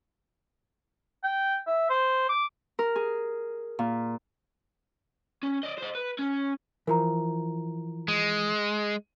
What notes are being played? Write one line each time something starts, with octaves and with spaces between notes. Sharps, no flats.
G5
E5
C5
D6
A#4
G#4
A#2
C#4
D5 D#5
C5 D#5
B4
C#4
E3 F3 A#4 A#5
G#3